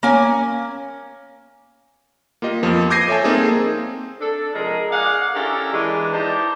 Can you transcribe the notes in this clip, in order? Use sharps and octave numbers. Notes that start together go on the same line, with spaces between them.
A#3 C#4 G#5
A#3 F4 G4 D#5
F2 F3 B3
D6 G6 G#6 A#6 C7 D#7
A4 C#5 E5 G#5 A5
A#3 C4 D#4 G#4 A4
D4 A4
C3 F3 G#3 G#4 A#4
G#4 D5 F5 F#5
C#4 D4 E4 G4 A4 A#4
E3 G#3 D4
D#4 E4 G4 C5 D5 A5